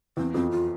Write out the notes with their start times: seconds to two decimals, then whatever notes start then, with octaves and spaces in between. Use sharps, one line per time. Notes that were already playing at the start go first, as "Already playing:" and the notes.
0.17 E2 C4
0.34 F2 C4
0.51 F4